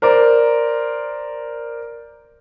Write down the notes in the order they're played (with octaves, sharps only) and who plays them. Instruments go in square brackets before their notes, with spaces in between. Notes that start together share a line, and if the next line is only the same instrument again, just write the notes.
[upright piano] A#4 C5 D5